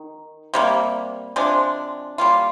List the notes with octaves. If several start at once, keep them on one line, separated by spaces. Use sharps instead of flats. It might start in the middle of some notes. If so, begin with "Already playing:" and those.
Already playing: D#3
C3 G3 A#3
C3 F3 G#3 D4
G3 A#3 F4